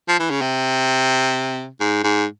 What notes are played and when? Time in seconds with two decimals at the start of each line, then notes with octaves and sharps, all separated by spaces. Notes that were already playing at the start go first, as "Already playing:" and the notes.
0.08 F3
0.20 E3
0.31 C#3
0.41 C3
1.80 G#2
2.04 G#2